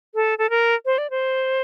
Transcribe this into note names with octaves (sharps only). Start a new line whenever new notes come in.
A4
A4
A#4
C5
D5
C5